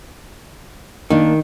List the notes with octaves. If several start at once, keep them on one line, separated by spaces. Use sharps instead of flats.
D#3 A#3 D4